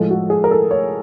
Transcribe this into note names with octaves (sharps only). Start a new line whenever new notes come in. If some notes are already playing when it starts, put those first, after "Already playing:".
Already playing: A2 F3 G#3 A4
F#4
G#4
A#4
A4
C#5